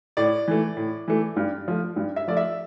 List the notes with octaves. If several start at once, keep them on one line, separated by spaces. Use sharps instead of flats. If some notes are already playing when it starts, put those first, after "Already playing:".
A2 D5
E3 A3
A2
E3 A3
G2
F3 A3
G2
E5
F3 A3 D5
E5